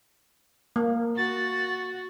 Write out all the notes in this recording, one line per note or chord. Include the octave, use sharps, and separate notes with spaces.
A#3
F#4 A6